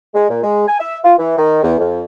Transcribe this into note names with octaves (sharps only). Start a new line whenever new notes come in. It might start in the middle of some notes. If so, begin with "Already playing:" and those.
G#3
A#2
G#3
G#5
E5
F4
E3
D#3
E2
F2